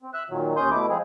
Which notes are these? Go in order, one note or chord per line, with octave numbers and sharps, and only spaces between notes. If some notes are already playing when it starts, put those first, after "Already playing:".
C4
E5 E6 F#6
A#2 D#3 F#3
D#2 C#4 C6 D#6 G6
B2 A3 E4 D6
F3 G#3 C4 G#4